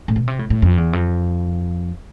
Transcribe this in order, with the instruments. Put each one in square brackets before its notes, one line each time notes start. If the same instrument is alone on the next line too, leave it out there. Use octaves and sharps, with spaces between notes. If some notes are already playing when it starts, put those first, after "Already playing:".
[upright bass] A2
B2
C3
A2
A2
F2
E2
F2